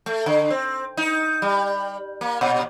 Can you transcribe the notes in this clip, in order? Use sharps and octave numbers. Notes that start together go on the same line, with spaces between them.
A3
D3
C4
D#4
G3
A#3
A#2